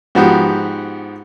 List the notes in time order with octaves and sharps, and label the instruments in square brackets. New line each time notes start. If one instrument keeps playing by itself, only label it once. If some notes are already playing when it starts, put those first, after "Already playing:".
[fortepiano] G#2 F3 B3 F#4 G4